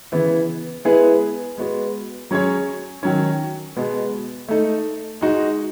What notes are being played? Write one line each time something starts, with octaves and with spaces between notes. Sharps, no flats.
C#3 E3 B3 E4
G#3 B3 E4 G#4 B4
G#3 B3 F#4
F#3 C#4 G#4 C#5
D#3 F#3 C#4
B2 G#3 B3
A3 D#4 A4
G#3 D#4 F#4